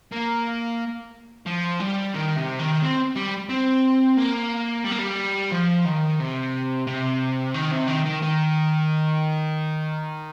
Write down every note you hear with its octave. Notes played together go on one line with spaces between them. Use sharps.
A#3
F3
G3
D#3
C3
D#3
C4
G3
C4
A#3
G3
A#3
G3
F3
D#3
C3
C3
D#3
C3
D#3
D#3
D#3